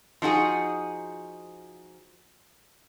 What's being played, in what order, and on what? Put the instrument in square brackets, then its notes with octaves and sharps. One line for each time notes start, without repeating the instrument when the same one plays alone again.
[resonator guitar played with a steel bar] F3 D#4 F#4 G#4